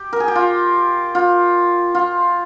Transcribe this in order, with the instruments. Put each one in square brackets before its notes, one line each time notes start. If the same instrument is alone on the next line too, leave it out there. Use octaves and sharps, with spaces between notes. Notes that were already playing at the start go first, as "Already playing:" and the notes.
Already playing: [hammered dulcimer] G4
A#4
G#4
G4
F4
F4
F4